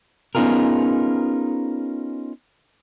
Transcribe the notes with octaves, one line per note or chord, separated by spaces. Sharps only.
B3 C#4 D#4 F4 G#4 A#4